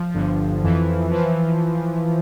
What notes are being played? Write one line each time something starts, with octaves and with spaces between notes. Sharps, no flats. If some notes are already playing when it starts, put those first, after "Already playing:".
Already playing: F3
G1 G2 D3
F2 E3
E3 F3